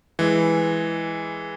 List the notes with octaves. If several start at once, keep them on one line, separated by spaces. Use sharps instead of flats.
E3 G#3